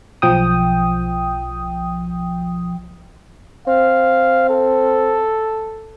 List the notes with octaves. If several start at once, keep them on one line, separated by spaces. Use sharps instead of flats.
B1 F3 G5 D#6
C4 F5
A4